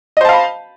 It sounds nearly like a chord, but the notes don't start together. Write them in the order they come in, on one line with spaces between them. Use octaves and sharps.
D#5 C5 A5 F5 B5